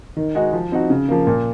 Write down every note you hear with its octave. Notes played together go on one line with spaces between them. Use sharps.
D#3
G#3 D#4 F#4
F3
C4 D#4 F#4
C#3
F3 A#3
A#2